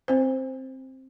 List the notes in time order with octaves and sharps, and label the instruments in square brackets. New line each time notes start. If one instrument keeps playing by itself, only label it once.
[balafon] C4 C5